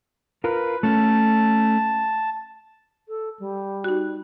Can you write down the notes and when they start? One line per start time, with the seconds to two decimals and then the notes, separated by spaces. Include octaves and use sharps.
0.44 F4 A#4 B4
0.83 A3 C#4 A5
3.09 A4
3.39 G3
3.84 D#4 F#4